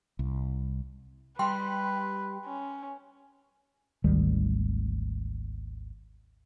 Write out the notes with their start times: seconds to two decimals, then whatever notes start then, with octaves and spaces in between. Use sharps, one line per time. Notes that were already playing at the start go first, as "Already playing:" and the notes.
0.19 C2
1.39 G3 G4 B4 G5 C6
2.45 C#4
4.04 G#1 D2 D#3 G3